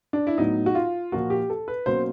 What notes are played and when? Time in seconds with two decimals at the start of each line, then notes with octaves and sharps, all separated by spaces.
0.13 D4
0.27 E4
0.38 A2 F#3 B3 D#4
0.66 F#4
0.75 F4
1.12 A#2 F3 A#3 F#4
1.30 G4
1.50 A4
1.68 B4
1.86 B2 F#3 A#3 C#4 C5